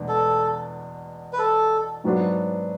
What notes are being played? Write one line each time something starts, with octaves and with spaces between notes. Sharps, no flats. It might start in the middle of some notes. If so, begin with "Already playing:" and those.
Already playing: E2 B2 G#3 B3 D4
A4
B4
A4
G#2 F#3 B3 D4 F#4